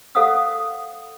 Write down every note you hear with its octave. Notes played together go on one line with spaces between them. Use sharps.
A4 C5 F5 F#5 D#6 E6